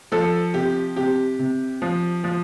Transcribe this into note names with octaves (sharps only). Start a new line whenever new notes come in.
F3 A4
C3 G4
C3 G4
C3
F3
F3